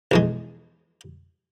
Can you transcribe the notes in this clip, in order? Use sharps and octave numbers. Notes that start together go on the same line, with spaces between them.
B1 E2 G#3